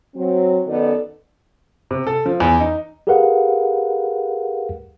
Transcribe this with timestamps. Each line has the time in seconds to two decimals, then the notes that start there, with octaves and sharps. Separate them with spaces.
0.15 F#3 C4
0.66 F#2 D#3 B3 D#4 A4 D5
1.91 C3
2.07 A4
2.26 F3
2.40 E2
2.60 D#4
3.07 G4 G#4 A#4 B4 F5 F#5